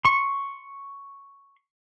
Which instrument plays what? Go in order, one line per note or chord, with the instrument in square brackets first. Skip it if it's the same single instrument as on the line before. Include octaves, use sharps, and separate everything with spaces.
[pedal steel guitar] C6 C#6